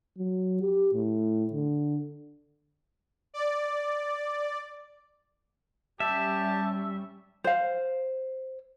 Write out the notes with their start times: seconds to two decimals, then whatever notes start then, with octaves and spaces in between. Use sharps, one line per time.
0.18 F#3
0.62 G4
0.93 A2
1.53 D3
3.34 D5
6.00 G3 C#4 G4 E5 A5
7.44 C5 F5